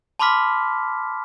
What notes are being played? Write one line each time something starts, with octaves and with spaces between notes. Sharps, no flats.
A5 B5 C6 D6 F6 B6